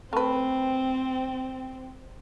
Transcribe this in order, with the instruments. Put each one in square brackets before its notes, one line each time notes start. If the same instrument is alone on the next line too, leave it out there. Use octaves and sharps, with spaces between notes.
[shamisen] A3 B4 [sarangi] C4